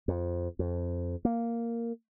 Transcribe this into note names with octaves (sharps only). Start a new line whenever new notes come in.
F2
F2
A#3